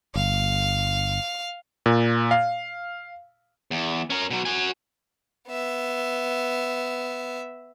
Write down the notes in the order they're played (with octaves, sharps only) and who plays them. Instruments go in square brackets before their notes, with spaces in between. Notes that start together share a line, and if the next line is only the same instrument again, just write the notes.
[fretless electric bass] G1 [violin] F5
[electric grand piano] A#2
F5
[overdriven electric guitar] E2
C#4 A#4
B2 F#3
F#4 G#5
[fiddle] B3 E5